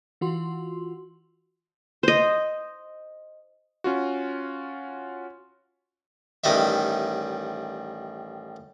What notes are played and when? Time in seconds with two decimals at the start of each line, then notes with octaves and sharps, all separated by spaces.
0.21 E3 F4 F#4 C6
2.03 C5 D#5
3.84 C#4 F4 F#4
6.44 A1 D#3 G3 D#5 E5